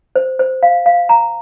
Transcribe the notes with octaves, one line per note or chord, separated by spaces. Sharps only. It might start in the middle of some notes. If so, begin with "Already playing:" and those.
C5
C5
F5
F5
A#5